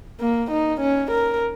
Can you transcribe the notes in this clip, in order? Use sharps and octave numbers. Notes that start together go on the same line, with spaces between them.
A#3
D#4
C#4
A#4